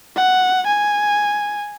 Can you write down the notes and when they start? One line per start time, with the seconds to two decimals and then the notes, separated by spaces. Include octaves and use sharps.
0.16 F#5
0.67 G#5